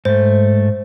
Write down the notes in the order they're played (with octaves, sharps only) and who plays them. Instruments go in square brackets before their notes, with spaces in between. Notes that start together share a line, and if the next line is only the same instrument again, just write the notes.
[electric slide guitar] G#2 A3 [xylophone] C5